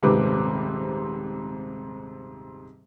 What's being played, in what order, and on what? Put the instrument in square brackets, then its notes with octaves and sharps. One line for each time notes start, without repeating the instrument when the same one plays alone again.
[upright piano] D#1 G#2 C3 C4 B4 D6